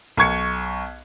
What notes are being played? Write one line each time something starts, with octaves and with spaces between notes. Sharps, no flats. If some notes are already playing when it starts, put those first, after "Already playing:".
B1 C#6 G#6 C#7